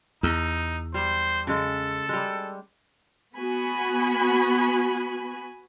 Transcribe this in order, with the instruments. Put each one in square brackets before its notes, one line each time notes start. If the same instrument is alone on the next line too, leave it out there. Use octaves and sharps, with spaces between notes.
[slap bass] E2 [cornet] D#4
[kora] G3 [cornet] C5
[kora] C#3 G#3 [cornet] A4
[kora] G3 G#3
[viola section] B3 F#4 G#5 B5